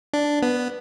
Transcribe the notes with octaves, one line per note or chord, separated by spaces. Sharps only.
D4
B3